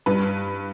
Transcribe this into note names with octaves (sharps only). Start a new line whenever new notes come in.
G2 B4